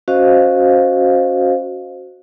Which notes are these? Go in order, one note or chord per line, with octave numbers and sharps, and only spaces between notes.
C#4 F#4 C5 D#5 F5